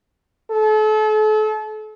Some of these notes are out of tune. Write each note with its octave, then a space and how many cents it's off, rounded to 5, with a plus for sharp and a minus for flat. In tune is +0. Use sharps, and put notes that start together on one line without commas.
A4 -35